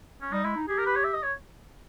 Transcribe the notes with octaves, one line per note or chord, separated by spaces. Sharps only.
C#4
G3 D#4
G#3 E4
D#4
G4 G#4
A#4
B4
C#5
E5
D#5
C#5